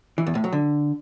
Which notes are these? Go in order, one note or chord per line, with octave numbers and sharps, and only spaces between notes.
E3
E2
A2
F#3
D3